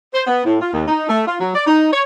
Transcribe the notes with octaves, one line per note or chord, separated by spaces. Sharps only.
C5
B3
A2
F4
D#2
D#4
A3
F4
F#3
D5
D#4
C#5